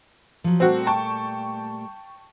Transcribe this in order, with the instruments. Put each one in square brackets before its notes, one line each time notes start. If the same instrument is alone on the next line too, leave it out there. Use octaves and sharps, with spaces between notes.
[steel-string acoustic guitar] F3 F#3
[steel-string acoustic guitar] A#2 G3 A3 [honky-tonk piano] C4 F#4
[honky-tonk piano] G5 A5 C#6